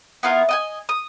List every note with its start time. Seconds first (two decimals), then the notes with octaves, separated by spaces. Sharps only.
0.23 B3 E4 F4 A#4
0.49 D#5 F#5 G#5
0.89 D#6